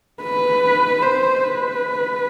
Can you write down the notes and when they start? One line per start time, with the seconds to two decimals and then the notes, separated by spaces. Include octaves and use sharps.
0.23 B4
1.02 C5
1.43 B4